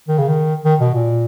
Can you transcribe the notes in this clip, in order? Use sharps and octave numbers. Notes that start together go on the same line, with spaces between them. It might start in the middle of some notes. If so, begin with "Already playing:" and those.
D#3
C#3
D#3
D#3
B2
A#2